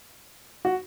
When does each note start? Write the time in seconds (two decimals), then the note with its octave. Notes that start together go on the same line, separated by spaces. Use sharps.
0.65 F#4